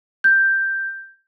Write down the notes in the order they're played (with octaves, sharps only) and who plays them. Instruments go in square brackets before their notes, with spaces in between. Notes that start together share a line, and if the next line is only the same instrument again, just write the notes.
[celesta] G6